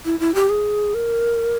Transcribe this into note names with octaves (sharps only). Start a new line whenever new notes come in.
E4
E4
G4
G#4
A#4